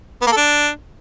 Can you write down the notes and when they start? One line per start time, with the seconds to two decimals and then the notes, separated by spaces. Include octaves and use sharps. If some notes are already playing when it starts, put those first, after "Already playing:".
0.22 B3
0.27 A#3
0.32 A4
0.37 D4